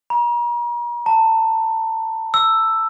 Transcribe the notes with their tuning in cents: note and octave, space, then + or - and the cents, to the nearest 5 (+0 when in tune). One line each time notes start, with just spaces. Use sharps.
A#5 +40
A5 +25
E6 +5